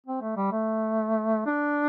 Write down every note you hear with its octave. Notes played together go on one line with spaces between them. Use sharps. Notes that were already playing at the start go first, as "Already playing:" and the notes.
C4
A3
G3
A3
D4